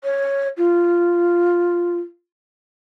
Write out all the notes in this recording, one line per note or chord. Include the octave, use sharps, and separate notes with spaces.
C#5
F4